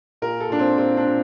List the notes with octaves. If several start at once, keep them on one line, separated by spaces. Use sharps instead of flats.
A#2 A#4
A4
A#2 D4
C4
A#2 C4
D4
A#2